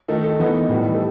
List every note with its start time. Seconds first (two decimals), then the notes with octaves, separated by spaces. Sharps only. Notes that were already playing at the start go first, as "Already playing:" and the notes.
0.08 D#3 A3 D#4 A4
0.24 A4
0.39 E3 B3 D#4
0.69 A2 E3 G3 D#4
0.94 A4